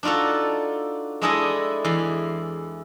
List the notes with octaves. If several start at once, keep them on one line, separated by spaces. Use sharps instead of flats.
D4 D#4 F4 F#4 A4
G#3 D4 E4 G#4 A4 D#5
E2 C6